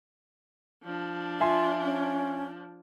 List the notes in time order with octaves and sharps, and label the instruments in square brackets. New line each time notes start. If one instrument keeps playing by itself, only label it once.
[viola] F3 D4
[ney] F4 [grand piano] E5 G#5 C6
[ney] C#4